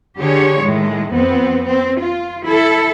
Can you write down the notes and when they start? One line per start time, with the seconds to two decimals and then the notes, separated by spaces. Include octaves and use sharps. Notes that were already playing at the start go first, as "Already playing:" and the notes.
0.18 D3 G4 G#4 C#5
0.61 A2 D#3 G#3
1.11 F2 B3 C4
1.67 C4
2.01 F4
2.44 E4 A4